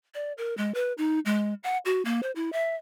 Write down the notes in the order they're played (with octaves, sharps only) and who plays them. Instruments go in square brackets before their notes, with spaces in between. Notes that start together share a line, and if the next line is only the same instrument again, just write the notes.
[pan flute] D5
A#4
G#3
B4
D#4
G#3
F#5
F#4
A#3
C5
E4
E5